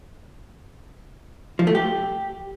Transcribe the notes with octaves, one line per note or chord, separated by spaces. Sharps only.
F3
A3
G4